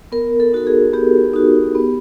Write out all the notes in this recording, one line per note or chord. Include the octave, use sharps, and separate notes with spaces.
B3 A#4
A4
D#4 F#4 A4
G#4
B3 G4
D#4 F#4
B3